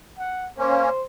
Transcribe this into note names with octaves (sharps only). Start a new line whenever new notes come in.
F#5
A#3 C#4 C5